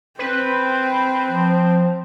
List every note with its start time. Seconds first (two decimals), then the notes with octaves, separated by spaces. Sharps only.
0.19 C4 B4
1.27 F3